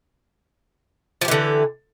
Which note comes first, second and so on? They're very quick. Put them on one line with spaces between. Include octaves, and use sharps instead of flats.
F3 G4 E3 D3